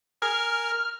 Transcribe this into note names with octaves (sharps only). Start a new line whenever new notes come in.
A#4 G#5 F6